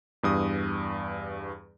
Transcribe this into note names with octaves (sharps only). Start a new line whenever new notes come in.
E2 G2 D#6